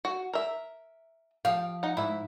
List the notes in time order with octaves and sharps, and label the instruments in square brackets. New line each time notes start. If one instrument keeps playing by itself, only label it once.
[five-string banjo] F#4
A#4 E5
[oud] F3 F5 [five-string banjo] G4
[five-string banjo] D#4 F#5
[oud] G#2 [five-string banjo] E4 E5